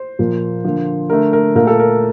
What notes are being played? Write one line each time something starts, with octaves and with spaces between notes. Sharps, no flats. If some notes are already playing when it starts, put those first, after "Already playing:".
Already playing: C5
A#2 F3 A#3
D3 F3 A#3
D3 A3 A#4
A#4
A#2 A3 A#4
A4
A#4